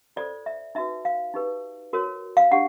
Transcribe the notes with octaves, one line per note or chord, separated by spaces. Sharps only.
F4 A4 C5 D5
E5
D#4 F#4 B4 E5
F5
D#4 G4 B4
F#4 A#4 C#5
F5
D4 G4 F#5